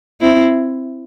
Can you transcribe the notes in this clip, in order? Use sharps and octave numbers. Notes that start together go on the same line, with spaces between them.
C4 E4